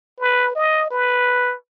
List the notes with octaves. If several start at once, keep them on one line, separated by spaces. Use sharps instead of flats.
B4
D#5
B4